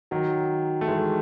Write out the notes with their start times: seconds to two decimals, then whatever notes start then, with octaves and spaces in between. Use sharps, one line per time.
0.11 D#3 F#3
0.81 A3
0.88 E3 G#3